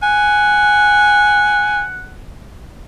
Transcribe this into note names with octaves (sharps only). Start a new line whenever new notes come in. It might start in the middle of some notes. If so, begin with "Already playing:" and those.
F#5 G#5